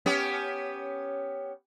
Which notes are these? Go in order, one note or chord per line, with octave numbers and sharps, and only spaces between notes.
B3 C#4 G4